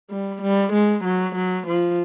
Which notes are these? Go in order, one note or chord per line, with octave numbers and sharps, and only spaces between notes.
G3
G3
G#3
F#3
F#3
F3